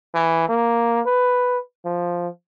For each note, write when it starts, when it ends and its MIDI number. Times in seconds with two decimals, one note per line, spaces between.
0.15 0.49 52
0.49 1.01 58
1.06 1.58 71
1.85 2.28 53